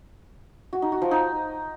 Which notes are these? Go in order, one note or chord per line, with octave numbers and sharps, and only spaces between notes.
F#4
D#4
F#4
F3
D#4